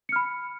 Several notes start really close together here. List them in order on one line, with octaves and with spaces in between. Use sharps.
C#7 F6 B5